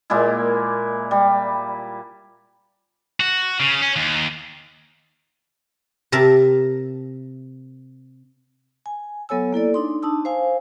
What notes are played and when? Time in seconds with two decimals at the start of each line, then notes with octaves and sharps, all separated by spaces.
0.10 A#2 G#3 A#3 E4
1.11 G3
3.20 F#4
3.60 C#3
3.82 C#4
3.96 D#2
6.12 C3 A#4 E5 A5
8.86 G#5
9.29 F#3 B3 A4 C#5 G#5 E6
9.53 A#3 E4 A4 D5
9.74 D4 D#4 C6
10.03 D4 D#4 A5 D#6 E6
10.25 C5 F5 G#5